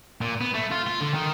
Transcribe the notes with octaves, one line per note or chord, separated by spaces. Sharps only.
A#2
B3
A3
F4
F4
D3
D#3